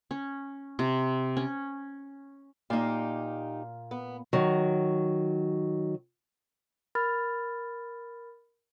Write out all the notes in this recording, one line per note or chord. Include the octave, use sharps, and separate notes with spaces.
C#4
C3
C#4
A#2 A#3 D#4 G4
B3
D#3 F#3
A#4 B5 F6 A6